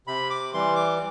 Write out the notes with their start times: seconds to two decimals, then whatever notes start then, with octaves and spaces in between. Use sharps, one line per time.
0.07 C3 B5
0.30 D6
0.53 E3 G3 C6
0.76 D6